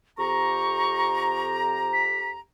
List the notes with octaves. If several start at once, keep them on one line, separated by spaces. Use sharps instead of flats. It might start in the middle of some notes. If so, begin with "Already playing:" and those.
F2 G4 A#5 C#6
B6